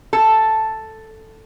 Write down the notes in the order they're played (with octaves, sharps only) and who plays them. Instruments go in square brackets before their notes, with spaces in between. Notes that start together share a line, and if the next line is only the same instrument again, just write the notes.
[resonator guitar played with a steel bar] A4